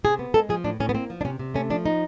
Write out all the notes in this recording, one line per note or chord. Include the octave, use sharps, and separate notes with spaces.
C3 G#4
B3
G#3 A4
F3 G#4
A2 D4
A2 C#4
B3
A#3 C4
F3
D4
C3 C#4
C3
A3 C#4
F3 D4
D#4